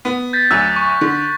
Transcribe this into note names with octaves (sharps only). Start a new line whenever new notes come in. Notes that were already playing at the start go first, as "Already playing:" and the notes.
B3
G6 A6 B6
D2 F#3 E6 F#6
C#6
D3